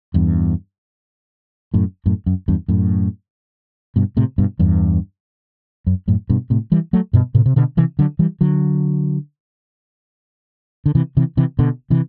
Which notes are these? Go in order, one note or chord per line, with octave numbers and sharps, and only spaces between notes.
E2 G2
F#2 A2
F#2 A2
F#2
E2 G2
F#2 A2
G2 B2
A2 C3
G2 B2
E2 G2
F#2
F#2 A2
G2 B2
A2 C3
E3 G3
F#3 A3
G2 B2
A2 C3
C3
B2 D3
C3 E3
D3 F#3
E3 G3
D3 F#3
D3
C3 E3
C3 E3
C3 E3
B2 D3
C3 E3